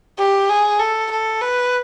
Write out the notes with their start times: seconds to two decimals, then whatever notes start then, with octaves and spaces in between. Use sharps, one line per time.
0.18 G4
0.50 G#4
0.80 A4
1.11 A4
1.42 B4